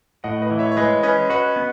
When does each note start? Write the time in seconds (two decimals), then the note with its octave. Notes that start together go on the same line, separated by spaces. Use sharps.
0.24 A2 D#5 F#5
0.42 B4 D#5
0.51 E3
0.59 C#5 E5
0.72 C#5
0.77 G#3 B4 D#5
1.03 C#4 B4 D#5
1.30 F#4 B4 D#5
1.56 B3